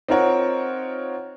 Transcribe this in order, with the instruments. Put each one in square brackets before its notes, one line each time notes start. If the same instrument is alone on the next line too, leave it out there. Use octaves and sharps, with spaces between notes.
[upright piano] C4 D#4 F4 A#4 C#5 F#5